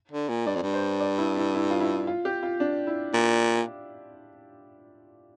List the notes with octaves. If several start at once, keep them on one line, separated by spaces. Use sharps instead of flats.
D3
A#2
G2 D5
F2
G2
C5
D5
E4
E4
E4
F4
E4
F4
G4
F4
D4
E4
A#2